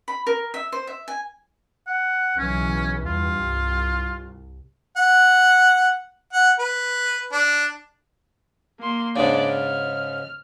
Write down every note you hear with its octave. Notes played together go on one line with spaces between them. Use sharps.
B5
A#4
E5
C5
E5
G#5
F#5
B1 C#3 E3 C#4
E2 G2 F4
C2
F#5
F#5
B4
D4
A#3 C6
G#2 C#3 D4 D5
F6